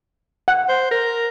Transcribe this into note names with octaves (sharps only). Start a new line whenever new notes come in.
F#5
C5
A#4